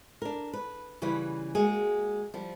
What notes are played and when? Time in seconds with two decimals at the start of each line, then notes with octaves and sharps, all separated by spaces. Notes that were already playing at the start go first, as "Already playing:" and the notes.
0.22 D4 A#4
0.53 B4
1.02 C#3 E3 G3 F4 B4
1.55 G#3 A#3 F#4 G#4
2.34 F3 G3